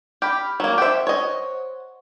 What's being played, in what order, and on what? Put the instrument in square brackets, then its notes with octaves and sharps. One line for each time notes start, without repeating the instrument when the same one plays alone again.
[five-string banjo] G4 [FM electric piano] B5 F6
[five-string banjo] F#3 A#3
[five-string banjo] G4 E5 [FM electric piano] C5 F#5
[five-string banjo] C#5 D#5